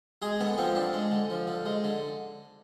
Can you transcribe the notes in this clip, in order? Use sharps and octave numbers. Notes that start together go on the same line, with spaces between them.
G#3 G#4
D3 B3
F3 C4
D3 D4
G#3
D3
F3
D3
G#3
D3